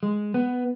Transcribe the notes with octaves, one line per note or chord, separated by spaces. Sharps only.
G#3
B3